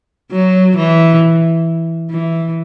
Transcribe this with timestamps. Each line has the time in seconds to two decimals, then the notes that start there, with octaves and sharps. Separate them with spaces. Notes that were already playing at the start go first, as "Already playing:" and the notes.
0.31 F#3
0.76 E3
2.10 E3